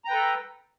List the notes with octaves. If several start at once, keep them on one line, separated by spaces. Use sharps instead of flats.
A4 B4 G5 A#5